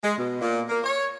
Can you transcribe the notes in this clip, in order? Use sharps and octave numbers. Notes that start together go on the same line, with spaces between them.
G#3
B2
A#2
A#3
C#5